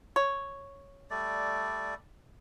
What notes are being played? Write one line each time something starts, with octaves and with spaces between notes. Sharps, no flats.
C#5
G3 A3 D5